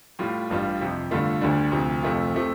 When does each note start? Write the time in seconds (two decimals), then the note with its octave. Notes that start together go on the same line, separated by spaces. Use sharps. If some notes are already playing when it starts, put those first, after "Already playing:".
0.19 A2 G3 F4
0.50 A1 G2 G3 F4
0.81 F2 C3 F3
1.11 G2 D3 A3 F4
1.41 D2 D3 G3 D4
1.72 D2 C3 F3
2.03 F2 C3 A3 F4
2.34 C3 F3 A3